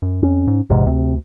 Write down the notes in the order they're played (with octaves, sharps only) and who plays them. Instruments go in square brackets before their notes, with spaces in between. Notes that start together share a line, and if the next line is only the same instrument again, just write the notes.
[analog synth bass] F#2
[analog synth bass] F2 [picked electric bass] C#4
[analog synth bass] G#2
[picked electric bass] A#1 E2 G#2 [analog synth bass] C3
[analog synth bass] D2 [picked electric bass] C3